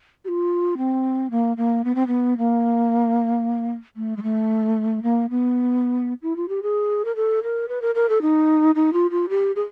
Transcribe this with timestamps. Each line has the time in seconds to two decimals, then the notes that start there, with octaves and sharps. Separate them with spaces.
0.25 G4
0.28 F4
0.77 C4
1.31 A#3
1.57 A#3
1.84 B3
1.95 C4
2.07 B3
2.38 A#3
3.97 A3
4.17 G#3
4.23 A3
5.03 A#3
5.30 B3
6.22 E4
6.36 F4
6.49 G4
6.63 G#4
7.05 A#4
7.16 A4
7.43 A#4
7.68 B4
7.82 A#4
7.95 A#4
8.09 A4
8.22 D#4
8.75 D#4
8.93 F4
9.11 F4
9.29 G4
9.56 G#4